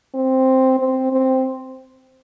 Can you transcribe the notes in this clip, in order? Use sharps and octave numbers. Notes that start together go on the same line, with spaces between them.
C4
C4
C4